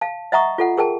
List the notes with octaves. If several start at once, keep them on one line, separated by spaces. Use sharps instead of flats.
F5 A5
D#5 E5 F#5 A#5 C#6 D#6
F4 A4 F#5
G#4 A#4 G5 A5